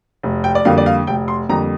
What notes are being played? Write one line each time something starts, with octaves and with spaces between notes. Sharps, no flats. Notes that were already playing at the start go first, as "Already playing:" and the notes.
F1
G5
D5
F2 D3 G3 A#3 F5
D5
F5
F1 G5
C6
F2 D3 G3 A#3 A#5